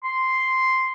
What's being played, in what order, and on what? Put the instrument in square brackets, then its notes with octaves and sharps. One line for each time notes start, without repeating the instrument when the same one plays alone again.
[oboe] C6